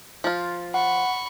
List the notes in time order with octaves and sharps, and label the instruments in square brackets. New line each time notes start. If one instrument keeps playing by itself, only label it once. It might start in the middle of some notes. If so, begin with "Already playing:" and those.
[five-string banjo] F3 F4
[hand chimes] F#5 [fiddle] B5 C#6